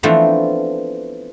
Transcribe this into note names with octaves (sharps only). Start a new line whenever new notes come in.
E3 F3 A3 B3 C4 D4